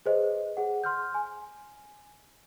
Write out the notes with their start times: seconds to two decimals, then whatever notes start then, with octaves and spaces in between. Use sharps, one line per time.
0.06 G#4 B4 C5 D#5
0.57 G#4 F#5
0.84 C6 F6 G6
1.14 G#5